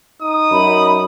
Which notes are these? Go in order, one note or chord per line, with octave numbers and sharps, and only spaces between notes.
D#4 D#6
F#2 B5